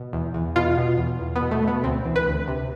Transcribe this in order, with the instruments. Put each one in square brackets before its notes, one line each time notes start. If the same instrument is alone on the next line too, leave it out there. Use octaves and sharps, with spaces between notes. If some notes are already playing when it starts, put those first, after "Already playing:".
Already playing: [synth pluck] B2
E2
E2
B2 F4
B2
E2
E2
B3
B2
A3
B2 B3
D2 C4
E3
B4
D2
C3